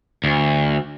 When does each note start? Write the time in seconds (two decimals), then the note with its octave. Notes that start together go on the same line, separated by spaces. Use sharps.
0.24 D2